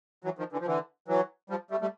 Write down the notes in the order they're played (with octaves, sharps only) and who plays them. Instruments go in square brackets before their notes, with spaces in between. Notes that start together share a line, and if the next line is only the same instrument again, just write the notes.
[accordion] E3 F#3
D#3 F3
D3 E3
F3
D3 E3
E3 F#3
F3 G3
G3 A3
G3 A3